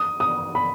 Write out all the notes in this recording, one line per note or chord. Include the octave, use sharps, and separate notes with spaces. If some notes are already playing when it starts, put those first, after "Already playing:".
Already playing: D#6
D#6
B5